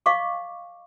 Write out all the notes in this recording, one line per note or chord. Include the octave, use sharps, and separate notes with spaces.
D#5 F5 C#6 D6